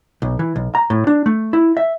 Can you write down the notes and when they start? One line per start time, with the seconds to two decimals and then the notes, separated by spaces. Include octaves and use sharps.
0.22 B1
0.39 E3
0.56 B1
0.75 A#5
0.90 A2
1.07 D4
1.26 A3
1.53 E4
1.77 E5